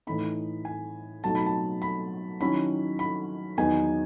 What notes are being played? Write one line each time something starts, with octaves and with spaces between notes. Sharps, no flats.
A2 E3 A3 D#4 B5
G#5
B2 F#3 A3 D#4 A5
B5
A5
B5
D#3 F#3 C#4 E4 B5
B5
E2 D#3 F#3 B3 D#4 G#5